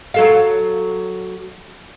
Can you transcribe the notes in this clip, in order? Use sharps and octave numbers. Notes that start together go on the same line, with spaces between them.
F#3 A4 F5